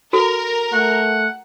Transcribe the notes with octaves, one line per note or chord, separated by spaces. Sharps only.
F#4 A4 A#4
A3 F#5